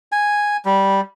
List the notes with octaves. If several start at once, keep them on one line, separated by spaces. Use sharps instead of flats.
G#5
G3